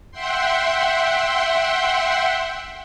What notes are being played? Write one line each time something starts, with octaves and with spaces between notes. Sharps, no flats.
E5 F#5 G5 C6